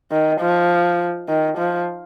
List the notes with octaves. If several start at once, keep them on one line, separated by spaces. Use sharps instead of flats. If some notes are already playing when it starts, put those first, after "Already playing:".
D#3
F3
D#3
F3